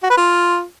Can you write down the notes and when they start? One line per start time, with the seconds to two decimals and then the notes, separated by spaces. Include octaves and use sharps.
0.03 F#4
0.10 B4
0.17 F4